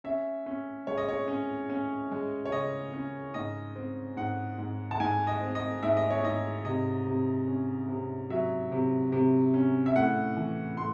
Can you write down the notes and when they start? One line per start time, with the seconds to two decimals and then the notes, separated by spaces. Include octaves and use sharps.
0.04 C#4 E5
0.46 C#4
0.87 G#3 C#5
0.98 D#5
1.09 C#5
1.28 C#4
1.70 C#4
2.11 G#3
2.45 C#5
2.52 C#3 D#5
2.93 C#4
3.34 G#2 D#5
3.76 C4
4.17 G#2 F#5
4.58 G#2
4.91 A5
5.00 G#2 G#5
5.27 D#5
5.41 C4
5.55 D#5
5.83 G#2 E5
5.97 D#5
6.10 C#5
6.24 G#2 D#5
6.65 C3 D#5
7.07 C3
7.48 C#4
7.88 C3
8.30 F#3 E5
8.72 C3
9.12 C3
9.54 C#4
9.86 E5
9.96 A2 F#5
10.37 E3
10.77 A2 C6